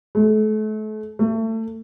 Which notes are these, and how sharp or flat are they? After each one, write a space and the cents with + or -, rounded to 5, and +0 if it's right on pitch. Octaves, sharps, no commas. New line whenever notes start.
A3 -40
A3 +25